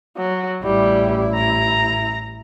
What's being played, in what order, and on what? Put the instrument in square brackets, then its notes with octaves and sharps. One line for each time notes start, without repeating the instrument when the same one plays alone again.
[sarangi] F#3
[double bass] A1 E4 [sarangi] G3
[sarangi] A#5